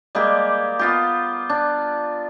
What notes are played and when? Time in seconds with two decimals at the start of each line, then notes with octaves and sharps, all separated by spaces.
0.15 G3 G#3 A#3 G4
0.79 B3 F4 G4
1.49 D4